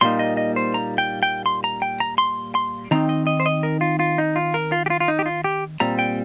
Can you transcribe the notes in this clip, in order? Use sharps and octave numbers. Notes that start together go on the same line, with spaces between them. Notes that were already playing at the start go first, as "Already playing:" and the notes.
A#2 G3 A#3 D#4 C6
D#5
D#5
C5
A#5
G5
G5
C6
A#5
G5
A#5
C6
C6
D#3 C4 D#4 A#5
D#5
D#5
C5
D#5
A#4
F4
F4
D#4
F4
A#4
F4
G4
F4
F4
D#4
G4
F4
G4
A#2 G3 C4 A#5
G5